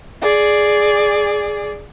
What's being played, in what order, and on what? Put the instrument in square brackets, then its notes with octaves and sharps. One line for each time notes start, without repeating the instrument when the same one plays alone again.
[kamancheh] G#4 D5